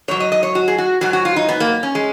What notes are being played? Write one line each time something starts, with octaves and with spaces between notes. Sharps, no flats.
G#2 F#3 C#5
D#5
D#5
C#5
F#4
G#4
F#4
G#2 F#3 F#4
F#4
F4
D#4
B3
A#3
C#4
G#3